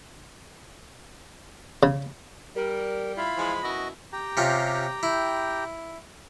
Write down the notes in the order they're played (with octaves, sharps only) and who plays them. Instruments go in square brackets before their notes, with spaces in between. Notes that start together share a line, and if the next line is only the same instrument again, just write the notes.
[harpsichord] C#3
[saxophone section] G3 [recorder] A#4
[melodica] E4 F4 F5 [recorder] B5
[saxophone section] E3 F3 G#3
[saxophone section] F#2 B2 E4 [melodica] F#4 D#5
[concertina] G4 G5 A#5
[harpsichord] C3 C#4 F4
E4